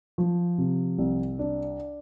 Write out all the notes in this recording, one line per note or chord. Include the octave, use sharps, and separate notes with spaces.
F3
C3
C2
D4